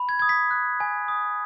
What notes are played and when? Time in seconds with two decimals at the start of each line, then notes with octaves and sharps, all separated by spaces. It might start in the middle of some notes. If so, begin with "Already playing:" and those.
Already playing: B5
0.09 G#6
0.19 D#6 G#6
0.29 B6
0.51 F#6
0.80 G#5
1.08 D#6